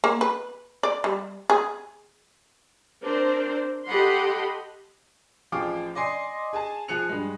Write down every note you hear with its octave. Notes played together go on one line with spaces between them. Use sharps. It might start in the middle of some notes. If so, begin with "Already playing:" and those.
A#3
B4
D5
G3
G#4
C4 D4 A#4 C5 D5
G4 A4 D#5 F#5 B5 C6
A1 F3 G#4 F5 G5 D6
D5 D#5 G#5 C6 C7
G#4 G#5 A5
F3 G#4 G#5 F#6 C#7 F7
G2 G#3